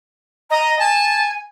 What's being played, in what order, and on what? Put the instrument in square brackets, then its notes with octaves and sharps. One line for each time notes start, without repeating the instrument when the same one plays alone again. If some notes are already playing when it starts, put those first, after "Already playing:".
[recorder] D#5 [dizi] A#5
[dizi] G#5 [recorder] A5